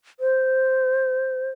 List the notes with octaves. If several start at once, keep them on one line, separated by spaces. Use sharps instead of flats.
C5